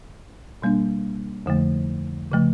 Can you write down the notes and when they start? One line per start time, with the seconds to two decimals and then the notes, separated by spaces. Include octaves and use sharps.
0.62 B2 G3 A#3 D4
1.46 F2 D3 F3 A3
2.32 C#3 F3 A3